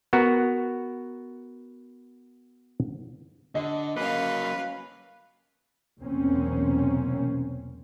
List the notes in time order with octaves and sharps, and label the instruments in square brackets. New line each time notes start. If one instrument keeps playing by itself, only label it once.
[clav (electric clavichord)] B3 F#4 A#4
[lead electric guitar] D3 [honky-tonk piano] D#5
[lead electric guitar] F#3 A#3 [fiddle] C#4 F5 [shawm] B4
[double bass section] B1 E2 C3 A#3 C4 C#4